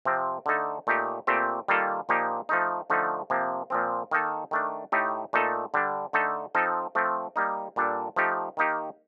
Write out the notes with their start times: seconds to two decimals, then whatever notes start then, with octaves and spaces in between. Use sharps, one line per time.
0.05 C3 F3 C4
0.46 D3 A3 D#4 A4
0.87 A#2 A3 D#4 G4
1.27 A#2 A3 C4 G4
1.68 D#3 G3 A#3 F4 A4
2.09 A#2 F3 A#3 D#4 G4
2.49 F3 A3 D#4
2.90 D3 F3 A3 D#4
3.30 C3 F3 A#3
3.70 A#2 F3 C4
4.11 D#3 A#3 D#4 A4
4.51 D#3 A3 D4
4.92 A2 A3 D#4 G4
5.33 A#2 A3 D#4 A4
5.74 D3 G3 D4
6.13 D3 A3 D#4 A4
6.55 F3 C4 D#4 A4
6.95 F3 A3 C4
7.36 G3 A#3 D#4
7.76 A#2 G3 D4 A4
8.16 F3 A3 D#4 G4
8.57 D#3 A#3 D#4 G4